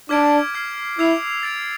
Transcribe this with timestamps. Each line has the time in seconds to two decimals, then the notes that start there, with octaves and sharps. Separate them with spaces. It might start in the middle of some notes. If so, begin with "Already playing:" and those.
0.09 D4 D6 F6 G#6 B6 D7
0.54 F6 G#6 C7
0.99 E4 E6 G#6 C7 F7
1.43 A6 D7 F7